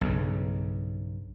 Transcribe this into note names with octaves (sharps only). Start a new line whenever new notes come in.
B1 G2 C#3